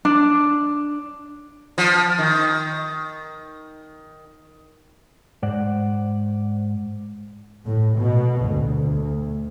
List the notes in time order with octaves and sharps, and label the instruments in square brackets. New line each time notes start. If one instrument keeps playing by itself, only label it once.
[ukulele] D4
[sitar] F3
D#3
[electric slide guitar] G#2 C5 D5 F#5
[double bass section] A2
B2
D2